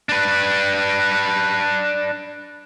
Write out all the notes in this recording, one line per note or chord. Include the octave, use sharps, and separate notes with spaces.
D4 B4